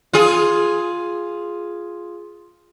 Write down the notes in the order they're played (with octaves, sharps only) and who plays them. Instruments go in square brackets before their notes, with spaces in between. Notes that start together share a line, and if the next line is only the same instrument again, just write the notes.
[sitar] F4 G#4